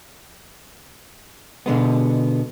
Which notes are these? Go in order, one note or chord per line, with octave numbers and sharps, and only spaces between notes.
B2 D3 G#3 B3